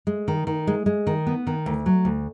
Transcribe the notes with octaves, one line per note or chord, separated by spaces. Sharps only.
G#3
D#3
D#3
G#3
G#3
D#3
B3
D#3
D2
F#3
D2